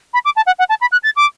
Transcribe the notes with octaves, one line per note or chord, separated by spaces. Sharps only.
B5
D6
A5
F#5
F#5
A5
B5
F#6
A6
D6